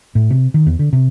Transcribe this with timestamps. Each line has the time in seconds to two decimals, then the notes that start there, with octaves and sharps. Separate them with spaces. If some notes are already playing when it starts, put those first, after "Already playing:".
0.15 A2
0.30 C3
0.54 D#3
0.67 E2
0.79 D3
0.93 C3